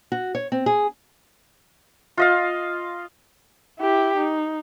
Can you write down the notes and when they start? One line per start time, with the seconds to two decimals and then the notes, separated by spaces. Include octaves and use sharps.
0.12 F#4
0.35 C#5
0.52 C4
0.66 G#4
2.17 F4 D#5 F5
3.79 E4 G4
4.17 D#4